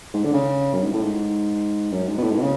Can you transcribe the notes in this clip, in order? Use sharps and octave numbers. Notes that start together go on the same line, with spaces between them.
G#2
D3
C#3
F#2
G#2
A2
G#2
F#2
G#2
B2
A2
G#2
B2
C#3